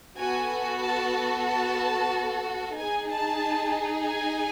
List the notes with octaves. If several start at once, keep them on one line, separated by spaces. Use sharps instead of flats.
B3 F#4 A4 G#5
A5
A5
D#4 G#4 G#5
A5
G#5